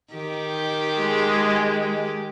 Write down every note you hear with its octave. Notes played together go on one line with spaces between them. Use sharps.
D#3 G4
G#3